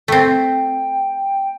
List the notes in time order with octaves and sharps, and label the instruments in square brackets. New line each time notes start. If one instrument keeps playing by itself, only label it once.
[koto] A3 C4 [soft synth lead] G5